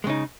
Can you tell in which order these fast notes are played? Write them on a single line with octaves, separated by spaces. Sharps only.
G#3 C#3 D#4